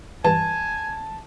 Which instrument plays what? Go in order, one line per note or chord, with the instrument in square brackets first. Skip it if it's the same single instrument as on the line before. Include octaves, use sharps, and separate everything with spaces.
[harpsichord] G2 E3 B3 [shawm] G#5 [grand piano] A5